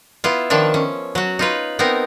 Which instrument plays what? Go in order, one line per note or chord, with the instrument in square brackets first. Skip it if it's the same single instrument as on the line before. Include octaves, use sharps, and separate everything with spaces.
[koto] B3 E4 F4
D#3 F3 D4 E5
C#4
F#3 F#4
D#4 F4 B4
B3 C4 D#4 A#4